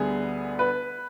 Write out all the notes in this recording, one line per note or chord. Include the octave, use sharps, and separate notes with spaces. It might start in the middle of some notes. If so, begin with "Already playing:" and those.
Already playing: D2 D3 G3 B3 G#4
B4